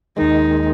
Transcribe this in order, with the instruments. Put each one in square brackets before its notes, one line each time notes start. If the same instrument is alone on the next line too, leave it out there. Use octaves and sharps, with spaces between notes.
[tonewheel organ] D#2 D#3 G#3 [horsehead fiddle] D#4